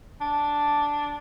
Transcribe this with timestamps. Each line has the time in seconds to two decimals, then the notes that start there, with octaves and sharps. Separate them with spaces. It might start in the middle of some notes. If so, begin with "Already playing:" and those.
0.21 D4